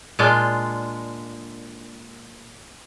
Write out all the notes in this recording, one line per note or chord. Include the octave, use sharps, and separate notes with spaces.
A#2 G#3 D4 F4